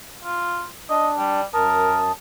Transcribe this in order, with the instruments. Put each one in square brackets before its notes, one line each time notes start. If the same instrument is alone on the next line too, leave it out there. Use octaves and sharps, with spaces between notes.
[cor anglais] F4
[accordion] D4 [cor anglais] D#5
[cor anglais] G3
[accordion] F#2 A5 D#6 [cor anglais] A#4